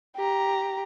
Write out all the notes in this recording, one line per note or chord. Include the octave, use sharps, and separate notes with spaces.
G4 A#5